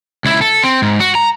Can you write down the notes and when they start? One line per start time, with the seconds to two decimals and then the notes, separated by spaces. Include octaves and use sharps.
0.25 C#2 E4
0.41 A4
0.64 C4
0.82 G#2
1.00 F#4
1.15 A#5